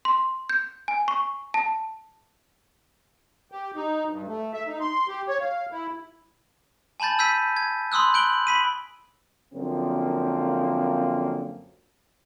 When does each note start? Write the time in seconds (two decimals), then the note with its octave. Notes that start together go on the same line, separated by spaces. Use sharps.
0.05 C6
0.49 G6
0.88 G#5
1.08 C#6
1.54 A5
3.52 G4
3.75 D#4
4.10 G2
4.27 A3
4.53 E5
4.67 D#4
4.80 C6
5.08 G4
5.29 C#5
5.40 F5
5.72 E4
7.00 G#5 A5 B5 G6 A6
7.19 E6 G6 B6 D#7
7.57 G#6
7.92 B5 C6 D#6 E6 F#6
8.14 F#6 G6 D7 F#7 G7
8.47 B5 B6 D#7
9.54 F#2 D3 F3 A#3 C4